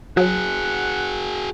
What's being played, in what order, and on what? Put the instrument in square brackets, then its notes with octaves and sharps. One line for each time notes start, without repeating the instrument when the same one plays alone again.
[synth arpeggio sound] F#3 [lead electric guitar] F#4 G#4 [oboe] F#5